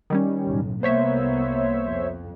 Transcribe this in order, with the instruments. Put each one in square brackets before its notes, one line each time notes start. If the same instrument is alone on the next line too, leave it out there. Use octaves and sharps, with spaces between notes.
[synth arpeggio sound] D#3 G3 C#4
[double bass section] F#1 B1 A2
[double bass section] C2 A#3 B3 [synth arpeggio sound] C5 C#5 E5
[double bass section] F2